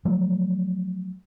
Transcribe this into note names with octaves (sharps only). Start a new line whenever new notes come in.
F3 F#3 A3